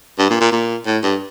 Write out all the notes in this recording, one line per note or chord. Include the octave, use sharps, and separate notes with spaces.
G2
A#2
A#2
A#2
A2
G2